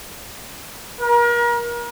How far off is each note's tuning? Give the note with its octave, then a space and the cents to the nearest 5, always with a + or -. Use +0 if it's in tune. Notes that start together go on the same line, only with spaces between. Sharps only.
A#4 +35